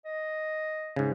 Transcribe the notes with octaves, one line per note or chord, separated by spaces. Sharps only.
D#5
G#2 C#3